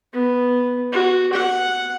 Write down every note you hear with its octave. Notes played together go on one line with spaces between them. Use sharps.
B3
F#4
F#5